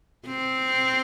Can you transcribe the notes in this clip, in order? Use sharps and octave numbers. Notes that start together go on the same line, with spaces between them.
C4